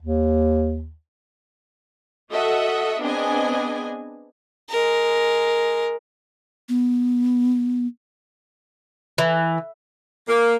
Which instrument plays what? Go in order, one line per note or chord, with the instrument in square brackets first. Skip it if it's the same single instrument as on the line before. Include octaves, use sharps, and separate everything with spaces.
[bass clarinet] D#2
[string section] F#4 A4 D#5 E5 F#5
B3 C4 D4 G#4 D#5 G#5
[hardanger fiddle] G#3 A#4
[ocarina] B3
[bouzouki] E3
[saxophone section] A#3